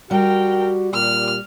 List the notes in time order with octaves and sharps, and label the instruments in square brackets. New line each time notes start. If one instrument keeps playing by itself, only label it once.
[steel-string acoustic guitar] G3 [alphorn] F#4 [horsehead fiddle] A#4 G5
[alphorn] A#2 [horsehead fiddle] G4 [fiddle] F6